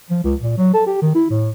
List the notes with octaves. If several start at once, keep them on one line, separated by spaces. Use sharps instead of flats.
F3
C#2
A#2
F#3
A4
G4
D#3
E4
A2